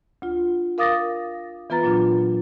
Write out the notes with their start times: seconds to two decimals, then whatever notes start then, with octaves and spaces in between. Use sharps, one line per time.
0.22 D2 F4
0.78 A#4 F5 D6 D#6 A6 A#6
1.70 E3 B3 F4 B4 A#5 A6
1.83 A#2 F#3 D4 F4